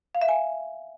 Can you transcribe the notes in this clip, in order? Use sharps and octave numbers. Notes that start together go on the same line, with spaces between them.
F5
E5
G#5